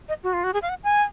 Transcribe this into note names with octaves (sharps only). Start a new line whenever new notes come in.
D#5
F#4
F4
F#4
G#4
F5
F#5
G#5